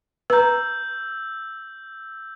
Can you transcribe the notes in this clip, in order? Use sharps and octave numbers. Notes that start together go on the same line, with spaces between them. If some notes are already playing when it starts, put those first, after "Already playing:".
B4 A#5 E6 G6